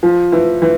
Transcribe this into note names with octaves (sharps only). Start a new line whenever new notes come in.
F3
E3
E3